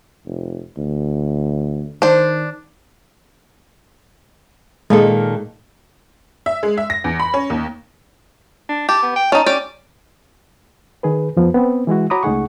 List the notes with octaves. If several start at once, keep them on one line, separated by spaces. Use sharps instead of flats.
F1
D2
D#3 D4 C5
A#2 D#3 G#3 A4
E5
G#3
E5
A#6
E2
B5
C#4
D#2
D4
G4 A5
B3
G5
C#4 D#4 A5
C#4 G4 D5 D6
D#3 G#4 B4
F2 F3 B3
B3 C4
E3 G#3 E4 F#4
F#4 C#5 A#5 B5 D6 D#6
C#2 A3 D#4 G#4 F#5 C#6